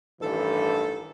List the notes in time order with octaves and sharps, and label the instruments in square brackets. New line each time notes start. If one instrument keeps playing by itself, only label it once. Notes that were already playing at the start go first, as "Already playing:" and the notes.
[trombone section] A1 G2 E3 [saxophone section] D#3 A4